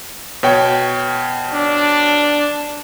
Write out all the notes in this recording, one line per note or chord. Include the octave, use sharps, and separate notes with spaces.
B2 C#5 G5
D4